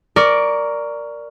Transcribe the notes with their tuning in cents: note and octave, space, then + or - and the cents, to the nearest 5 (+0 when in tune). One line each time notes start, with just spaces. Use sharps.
A#4 +0 D5 +0 C#6 +20